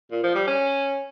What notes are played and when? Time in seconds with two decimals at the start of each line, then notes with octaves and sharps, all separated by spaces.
0.11 A#2
0.23 F3
0.35 G3
0.47 C#4